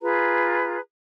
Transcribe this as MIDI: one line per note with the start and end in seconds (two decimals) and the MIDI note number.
0.02 0.79 65
0.02 0.79 68
0.02 0.79 71
0.02 0.79 82